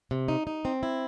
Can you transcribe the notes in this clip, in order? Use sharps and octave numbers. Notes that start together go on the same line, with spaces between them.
C3
D#4
D#4
C4
E4